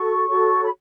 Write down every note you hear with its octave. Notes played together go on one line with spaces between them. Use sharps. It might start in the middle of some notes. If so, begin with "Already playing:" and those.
Already playing: F#4 A4 C#6
F#4 A4 C#5
B5